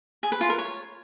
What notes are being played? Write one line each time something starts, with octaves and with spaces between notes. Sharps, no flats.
G#4
B4
F4
A#4
C#5